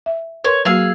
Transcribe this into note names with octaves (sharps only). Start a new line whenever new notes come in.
E5
A#4 B4 C#5 C6
F#3 A#3 F#4 G#4 F5 E6